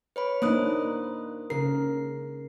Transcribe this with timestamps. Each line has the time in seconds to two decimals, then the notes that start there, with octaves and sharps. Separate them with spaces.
0.16 B4 C#5 B5
0.42 A#3 D4 D#4 C5 D#6 F#6
1.50 C#3 A#4 C7